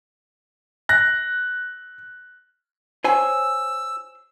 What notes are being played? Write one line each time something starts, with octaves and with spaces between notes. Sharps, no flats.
F#6 A#6
C5 C#5 G#5 E6